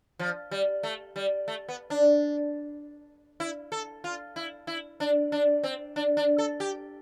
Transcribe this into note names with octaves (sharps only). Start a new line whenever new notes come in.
F3
G3
A3
G3
A3
B3
D4
E4
A4
F4
E4
E4
D4
D4
C4
D4
D4
A4
G4